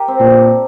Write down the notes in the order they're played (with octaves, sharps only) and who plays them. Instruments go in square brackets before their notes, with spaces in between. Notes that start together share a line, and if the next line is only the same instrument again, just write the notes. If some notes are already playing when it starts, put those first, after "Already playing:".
Already playing: [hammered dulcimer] G4 A#4
C4
[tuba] A#2 [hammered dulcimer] D4